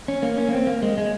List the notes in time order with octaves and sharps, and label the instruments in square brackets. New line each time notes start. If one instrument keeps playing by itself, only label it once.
[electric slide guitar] C#4
A#3
C#4
A#3
C4
A#3
G#3
G#3